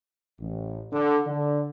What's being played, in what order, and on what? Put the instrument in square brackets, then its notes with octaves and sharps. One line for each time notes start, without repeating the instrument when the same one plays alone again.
[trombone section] A1
D3
D3